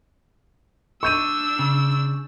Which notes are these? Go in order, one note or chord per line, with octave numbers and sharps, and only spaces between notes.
D4 C#6 E6 G6 D#7
C#3